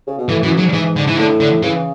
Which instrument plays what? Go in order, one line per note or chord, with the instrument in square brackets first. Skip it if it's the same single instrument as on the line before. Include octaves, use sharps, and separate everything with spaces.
[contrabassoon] C#3
B2
[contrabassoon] A2 [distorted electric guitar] E3
[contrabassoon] F#2 [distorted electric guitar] E3
[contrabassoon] G#2 [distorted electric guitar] F#3
[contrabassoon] G#2 [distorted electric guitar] E3
[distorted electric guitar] D3
E3
[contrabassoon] A2 [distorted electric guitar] D3
[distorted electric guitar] D3
[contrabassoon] C#3 [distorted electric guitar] E3